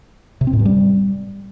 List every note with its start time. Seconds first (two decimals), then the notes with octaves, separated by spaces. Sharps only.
0.41 C3
0.47 C4
0.53 A2
0.59 G2
0.66 G3